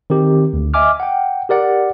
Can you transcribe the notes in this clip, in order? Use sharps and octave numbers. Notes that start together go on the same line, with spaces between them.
D#3 C4 G4
D2
D#5 E5 G#5 D6 F6
F#5 G5
G4 A#4 D5 F#5